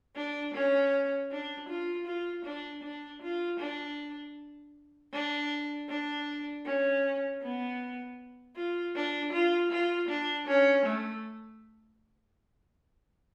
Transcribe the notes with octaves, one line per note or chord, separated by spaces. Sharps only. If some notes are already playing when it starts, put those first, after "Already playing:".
D4
C#4
D4
F4
F4
D4
D4
F4
D4
D4
D4
C#4
B3
F4
D4
F4
F4
D4
C#4
A3